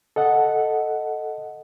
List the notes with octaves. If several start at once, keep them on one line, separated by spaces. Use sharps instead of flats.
A4 D#5 F#5